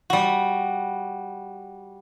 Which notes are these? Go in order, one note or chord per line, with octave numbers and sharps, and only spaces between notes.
G3 F#4